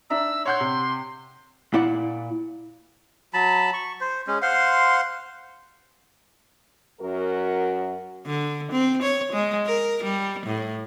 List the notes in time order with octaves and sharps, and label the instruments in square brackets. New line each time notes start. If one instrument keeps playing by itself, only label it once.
[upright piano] D4 E5 A#5 [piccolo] E6
[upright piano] C#5 F#5 G6 [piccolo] C6
[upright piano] C3
[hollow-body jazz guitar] A#2 E4 D5 F#5
[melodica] F#3 A5 B5
C#6
C5
G#3 C#4
C5 F5 F#5 C6
[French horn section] F#2 F#4 A#4
[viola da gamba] D3
C4
C#5
G#3
A#4
G3
A2